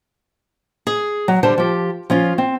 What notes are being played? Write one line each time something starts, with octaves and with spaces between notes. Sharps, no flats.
G#4
F#3
D3 G3 C5 A5
F3 G4
F3 C#4 F4
C4